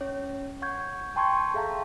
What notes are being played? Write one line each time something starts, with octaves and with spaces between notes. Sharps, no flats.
C#4 C#5
F#5 C#6 G6 G#6
G5 A5 C6 C#6 G6 G#6
G#4 A4 E5 F5 A5 A#5